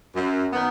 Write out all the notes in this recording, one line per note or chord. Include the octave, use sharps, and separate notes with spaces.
F#2
D#3 F#3 B3